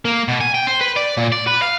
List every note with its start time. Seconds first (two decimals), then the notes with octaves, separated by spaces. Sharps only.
0.05 A#3
0.28 B2
0.41 G#5
0.54 G5
0.67 C5
0.81 B4
0.96 D5
1.17 A#2
1.32 D5
1.47 B4
1.62 F5